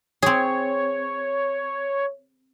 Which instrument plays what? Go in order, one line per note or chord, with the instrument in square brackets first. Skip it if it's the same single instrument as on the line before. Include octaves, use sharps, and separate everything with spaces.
[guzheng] C4 G#4 [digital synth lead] C#5